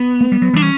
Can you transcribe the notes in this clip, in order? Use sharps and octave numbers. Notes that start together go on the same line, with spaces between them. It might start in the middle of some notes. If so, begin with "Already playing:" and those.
Already playing: B3
A#3
G3
F#3
E3 G3 D4
C#4